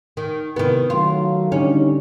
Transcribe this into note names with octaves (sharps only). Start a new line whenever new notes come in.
D#3
C3 D#3 B3 E4
D#3 F#3 A3 F4
D3 G3 C#4 D#4